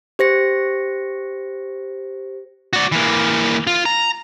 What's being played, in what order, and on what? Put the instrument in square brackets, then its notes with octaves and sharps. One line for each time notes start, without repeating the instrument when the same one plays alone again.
[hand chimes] G4 C5 A#6 C#7
[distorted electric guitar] F#4 D5
E3 A#3
F4
A#5